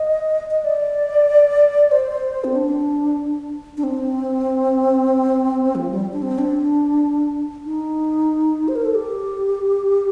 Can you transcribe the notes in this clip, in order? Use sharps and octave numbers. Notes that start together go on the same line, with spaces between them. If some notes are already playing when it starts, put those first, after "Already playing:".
Already playing: D#5
D#5
D5
C5
C4
D4
D4
C4
F3
G3
D4
C4
D4
D#4
C5
A#4
A4
G4